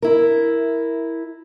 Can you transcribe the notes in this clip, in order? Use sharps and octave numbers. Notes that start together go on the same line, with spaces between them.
E4 A#4